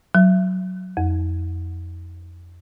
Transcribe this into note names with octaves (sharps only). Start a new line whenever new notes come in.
F#3
F2